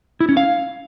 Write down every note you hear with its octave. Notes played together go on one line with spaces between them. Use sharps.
E4
C#4
F5